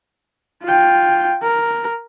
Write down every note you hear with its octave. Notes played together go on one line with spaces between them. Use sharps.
F4 G5
A#4